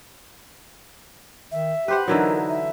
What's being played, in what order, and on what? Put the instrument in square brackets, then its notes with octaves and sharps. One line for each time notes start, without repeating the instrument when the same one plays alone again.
[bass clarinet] D#3 [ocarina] E5
[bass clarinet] G4 [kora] B4 C5 F#5
[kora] D3 E3 F#3 [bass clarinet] D#4 [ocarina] A#4
[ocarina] E5